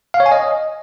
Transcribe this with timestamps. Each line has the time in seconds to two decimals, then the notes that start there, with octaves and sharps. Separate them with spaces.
0.14 F5
0.20 C#5
0.26 G#5
0.32 D#5